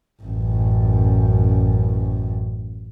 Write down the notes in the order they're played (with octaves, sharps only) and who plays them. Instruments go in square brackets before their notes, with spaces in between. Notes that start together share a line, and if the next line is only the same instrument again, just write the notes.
[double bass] A1 F#2